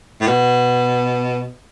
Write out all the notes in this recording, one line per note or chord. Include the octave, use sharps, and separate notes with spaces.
A2
B2